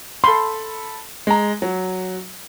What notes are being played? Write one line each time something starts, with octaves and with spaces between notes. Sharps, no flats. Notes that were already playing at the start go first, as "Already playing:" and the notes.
A4 B5 C6
G#3 A#5
F#3